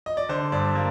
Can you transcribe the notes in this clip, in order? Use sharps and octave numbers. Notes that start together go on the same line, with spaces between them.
D#5
D5
D3 C5
G2 D5
A#3